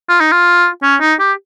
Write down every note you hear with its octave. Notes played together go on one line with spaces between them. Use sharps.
F4
D#4
F4
C#4
D#4
G4